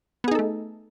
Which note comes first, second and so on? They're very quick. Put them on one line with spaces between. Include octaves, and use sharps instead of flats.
B3 G#4 D#4 A4 A3